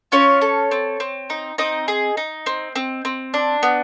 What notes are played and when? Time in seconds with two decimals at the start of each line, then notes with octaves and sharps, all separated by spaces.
0.12 C#4 F4 C#5
0.41 A4
0.71 C4
1.00 C4
1.30 D#4
1.58 C4 D#4 D#5
1.88 G#4
2.17 D#4
2.46 C4
2.76 C4
3.05 C4
3.34 D4
3.63 B3